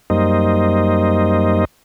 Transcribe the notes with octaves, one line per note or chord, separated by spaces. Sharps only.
F#2 G3 A#3 D#4 C5 D#5